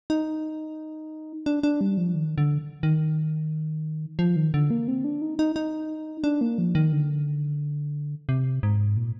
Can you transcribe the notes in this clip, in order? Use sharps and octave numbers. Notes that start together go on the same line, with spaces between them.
D#4
D4
D4
G3
F3
D#3
D3
D#3
F3
D#3
D3
A#3
C4
D4
D#4
D#4
D#4
D4
A#3
F3
D#3
D3
C3
G#2
A#2